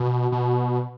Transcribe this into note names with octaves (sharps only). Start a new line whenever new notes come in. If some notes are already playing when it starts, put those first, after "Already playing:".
Already playing: B2
B2